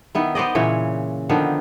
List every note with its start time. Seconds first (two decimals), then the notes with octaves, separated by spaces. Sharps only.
0.15 D#3 B3 E4
0.35 B3 C5 D5 D#5
0.55 A#2 C#3 E3 C#5
1.29 D3 D#3 F3 B3